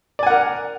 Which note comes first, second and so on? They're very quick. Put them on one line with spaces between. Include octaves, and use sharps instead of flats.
D5 G#5 F#5 A#4